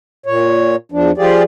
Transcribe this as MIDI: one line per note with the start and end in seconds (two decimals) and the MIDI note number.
0.26 0.76 46
0.26 0.76 73
0.92 1.11 40
0.92 1.11 53
0.92 1.11 62
1.18 1.43 53
1.18 1.43 65
1.18 1.43 67
1.18 1.43 68
1.18 1.43 74